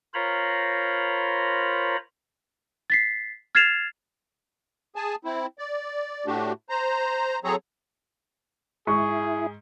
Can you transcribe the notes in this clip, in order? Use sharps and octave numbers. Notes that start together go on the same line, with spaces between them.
F4 A#4 C5 C#5 A#5 B5
A6 B6 C7
F6 G#6 A6 C7 E7 F7
G#4 G#5 A5
C4 E4
D5
A2 A3 D4 F#4 G4
C5 A#5
F#3 C4 G#4 A4 C#5 A#5
G#2 E4 G#4 C#6